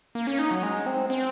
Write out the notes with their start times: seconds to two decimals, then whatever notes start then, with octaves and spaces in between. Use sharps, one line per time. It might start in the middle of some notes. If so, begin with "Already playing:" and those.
0.15 A#3
0.27 C#4
0.39 D#4
0.51 F#3
0.63 G#3
0.86 C4
1.10 C4